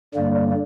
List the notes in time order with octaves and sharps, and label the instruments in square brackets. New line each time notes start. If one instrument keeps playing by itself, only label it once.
[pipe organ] G2 D3 G3 A#3 [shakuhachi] D5
[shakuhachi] D5
D5